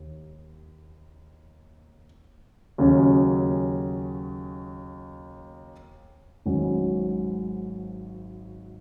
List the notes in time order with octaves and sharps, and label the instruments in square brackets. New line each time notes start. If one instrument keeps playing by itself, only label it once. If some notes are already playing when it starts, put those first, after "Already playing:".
Already playing: [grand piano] D#2
D#2 C#3 F#3 C#4
G#1 G#2 F#3 C#4